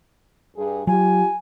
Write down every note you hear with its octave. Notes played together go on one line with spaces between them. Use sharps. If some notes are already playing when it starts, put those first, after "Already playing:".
G2 G#4
F#3 F4 G4 G#5